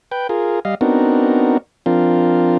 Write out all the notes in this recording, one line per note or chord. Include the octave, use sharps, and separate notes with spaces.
B4 G5
F4 G#4 A#4
G3 D#5 F5
B3 C4 D4 D#4 F#4 A#4
F3 C4 D4 F4 A#4